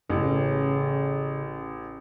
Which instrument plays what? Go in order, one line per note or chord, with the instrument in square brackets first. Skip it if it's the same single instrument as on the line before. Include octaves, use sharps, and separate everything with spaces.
[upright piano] A1 [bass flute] C#3